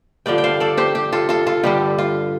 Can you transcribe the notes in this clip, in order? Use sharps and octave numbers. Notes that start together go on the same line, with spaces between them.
G2 D3 F3 D5 G5
G5
C5 F5
A4 D5
G4 C5
G4
F4 A4
F4 A4
F4 A4
G2 D3 G3 G4
F4